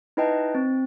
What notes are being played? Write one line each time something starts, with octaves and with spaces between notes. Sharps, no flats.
D#4 E4 B4 D#5 G5 A5
C4